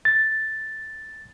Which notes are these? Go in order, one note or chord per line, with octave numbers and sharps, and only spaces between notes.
A6